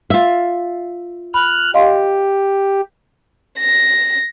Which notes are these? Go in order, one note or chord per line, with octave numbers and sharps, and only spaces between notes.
F4 E5
B5 F6 F#6
G4 D#5 F5 C6
A#6